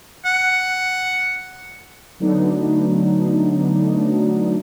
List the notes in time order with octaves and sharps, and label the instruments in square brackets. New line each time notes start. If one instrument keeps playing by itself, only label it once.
[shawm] F#5
[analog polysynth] D3 F#3 A3 B3 D4 D#4